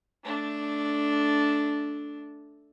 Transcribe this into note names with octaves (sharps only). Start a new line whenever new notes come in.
A3 D4